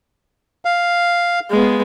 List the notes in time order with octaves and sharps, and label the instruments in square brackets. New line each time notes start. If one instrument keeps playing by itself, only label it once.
[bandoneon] F5
[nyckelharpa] G#3 B3